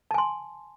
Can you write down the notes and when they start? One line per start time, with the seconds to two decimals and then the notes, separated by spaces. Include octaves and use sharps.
0.11 A5
0.14 G#5
0.18 C6